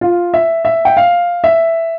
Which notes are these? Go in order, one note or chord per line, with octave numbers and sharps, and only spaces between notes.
F4
E5
E5
G5
F5
E5